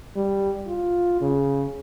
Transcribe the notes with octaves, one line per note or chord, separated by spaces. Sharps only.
G3
F4
C#3